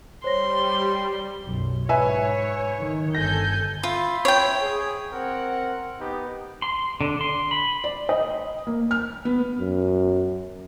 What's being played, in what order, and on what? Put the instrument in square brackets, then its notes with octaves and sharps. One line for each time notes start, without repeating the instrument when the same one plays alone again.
[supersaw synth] G3 [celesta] C5 C#5 A#6 [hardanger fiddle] C6
[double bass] B1 F#2
[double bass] G#2 [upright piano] B4 E5 G#5 [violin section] C#5
[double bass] D#3
[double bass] G1 [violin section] A4 G#5 G6 [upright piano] A#6
[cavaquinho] F4 [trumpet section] E5 B5 C6
[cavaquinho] C#5 G5
[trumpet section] G#4
C4 A#4 F#5
B3 D#4 G4
[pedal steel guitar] C6
D3
C6
B5
[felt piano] D5
D#5
A#3
F6
B3
[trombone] F#2